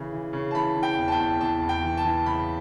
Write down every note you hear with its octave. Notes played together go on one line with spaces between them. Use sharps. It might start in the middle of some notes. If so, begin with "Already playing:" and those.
Already playing: C#3 E3
E3
C#3
A5
E3 B5
E3
G5
E2
A5
G5
E2
E2 A5
E2
G5
E3
A5
E3
C#3 B5